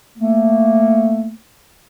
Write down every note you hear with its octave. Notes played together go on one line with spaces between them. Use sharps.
A3 A#3